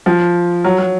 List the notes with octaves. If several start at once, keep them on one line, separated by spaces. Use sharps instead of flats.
F3
F#3
F#3